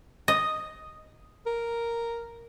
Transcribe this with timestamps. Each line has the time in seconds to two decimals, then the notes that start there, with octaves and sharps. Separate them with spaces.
0.28 D#5
1.46 A#4